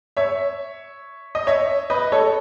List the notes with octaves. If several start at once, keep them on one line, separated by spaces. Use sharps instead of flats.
C#5 E5
D#5
C#5 E5
B4 D#5
A4 C#5